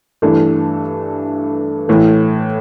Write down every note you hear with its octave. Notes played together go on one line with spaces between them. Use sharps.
G2 E3 A3 D4
A2 E3 A3